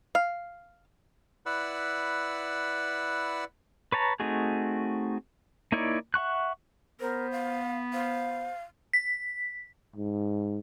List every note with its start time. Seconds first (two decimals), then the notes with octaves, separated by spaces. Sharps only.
0.15 F5
1.46 E4 B4 D5 F#5 B5 E6
3.92 B4 C#5 A5 A#5
4.20 A3 C4 D#4 F#4 G#4
5.72 A#3 D#4 E4 C#5 D5
6.14 E5 F#5 C#6 F#6
7.00 B3 A#4 C5
7.32 F5
7.93 C5 F5
8.93 B6
9.96 G#2